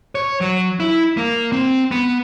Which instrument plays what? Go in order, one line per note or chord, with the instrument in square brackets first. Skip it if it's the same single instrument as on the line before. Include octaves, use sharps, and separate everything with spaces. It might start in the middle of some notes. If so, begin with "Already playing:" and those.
[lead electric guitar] C#5
F#3
E4
A#3
C4
B3